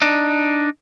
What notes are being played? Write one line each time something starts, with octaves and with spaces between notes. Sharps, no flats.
D4 D#4